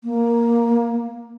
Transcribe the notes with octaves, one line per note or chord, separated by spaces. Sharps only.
A#3